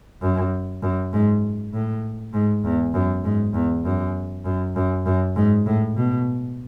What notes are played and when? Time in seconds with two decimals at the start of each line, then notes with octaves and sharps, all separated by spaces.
0.22 F#2
0.82 F#2
1.13 G#2
1.73 A2
2.34 G#2
2.64 E2
2.94 F#2
3.24 G#2
3.54 E2
3.85 F#2
4.45 F#2
4.76 F#2
5.06 F#2
5.36 G#2
5.66 A2
5.96 B2